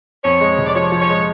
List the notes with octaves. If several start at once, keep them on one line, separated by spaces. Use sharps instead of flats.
F2 C#5
G#3
F1
D5
F3 C#5
F3
C#5
G#3